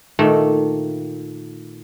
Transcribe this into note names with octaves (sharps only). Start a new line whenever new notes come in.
A#2 D#3 A3